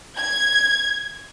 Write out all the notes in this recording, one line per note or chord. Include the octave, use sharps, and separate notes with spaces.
G#6